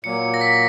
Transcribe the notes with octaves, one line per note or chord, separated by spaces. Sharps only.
A#2 F#3 A#3 C#7
A#6
B6